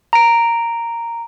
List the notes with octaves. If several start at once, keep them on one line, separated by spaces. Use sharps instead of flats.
A#5 D7